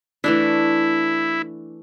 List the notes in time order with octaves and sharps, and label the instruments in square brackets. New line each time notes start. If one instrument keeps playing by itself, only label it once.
[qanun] E3 A3 D4 [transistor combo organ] E4